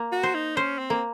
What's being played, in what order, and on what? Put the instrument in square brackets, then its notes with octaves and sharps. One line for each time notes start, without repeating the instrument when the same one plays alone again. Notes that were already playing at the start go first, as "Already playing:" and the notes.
Already playing: [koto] A#3
[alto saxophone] F#4
[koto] C5
[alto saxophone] D#4
[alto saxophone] C#4 [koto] C5
[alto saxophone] C4
[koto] A#3